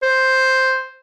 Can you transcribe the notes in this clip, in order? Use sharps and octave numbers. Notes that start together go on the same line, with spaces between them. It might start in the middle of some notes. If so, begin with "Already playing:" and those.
C5